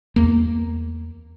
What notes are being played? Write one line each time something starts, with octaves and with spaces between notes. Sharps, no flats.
E2 A#3